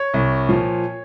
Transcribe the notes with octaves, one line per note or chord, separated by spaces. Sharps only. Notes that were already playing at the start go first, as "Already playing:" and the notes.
Already playing: C#5
C2
A#2 F3